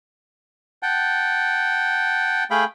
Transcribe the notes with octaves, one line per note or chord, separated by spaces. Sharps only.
F#5 G5 A5
A3 G#4 F5 G5 B5